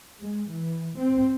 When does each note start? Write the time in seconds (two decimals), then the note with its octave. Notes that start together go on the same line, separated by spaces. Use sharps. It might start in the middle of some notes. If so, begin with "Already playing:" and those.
0.20 G#3
0.50 E3
0.98 C4